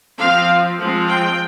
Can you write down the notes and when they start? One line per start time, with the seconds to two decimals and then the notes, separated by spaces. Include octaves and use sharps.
0.19 F3 C4 F5
0.79 F3 G#3 C4
1.08 G5